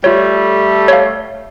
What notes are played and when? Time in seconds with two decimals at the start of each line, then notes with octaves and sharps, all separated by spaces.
0.04 G3 A3 F4 C#5
0.88 C#5 F5